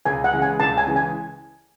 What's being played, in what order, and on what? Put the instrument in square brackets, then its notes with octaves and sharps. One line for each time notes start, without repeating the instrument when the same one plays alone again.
[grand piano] C#2 [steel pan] G#5
[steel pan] F#5
[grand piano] C#3 E3 G#3
[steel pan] G#5
[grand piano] C#2 [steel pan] A5
[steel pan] G#5
[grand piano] C#3 E3 G#3
[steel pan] G#5